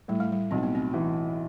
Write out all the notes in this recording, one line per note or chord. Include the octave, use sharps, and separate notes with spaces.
A2 G3
A3
G3
B1 C4
B3
C4
E3